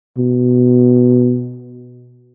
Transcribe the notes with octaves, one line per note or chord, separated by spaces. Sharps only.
B2